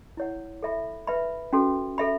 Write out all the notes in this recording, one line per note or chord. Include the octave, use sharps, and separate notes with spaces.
E4 C#5 F#5
A4 E5 B5
B4 E5 B5
C#4 F#4 A4
A4 E5 B5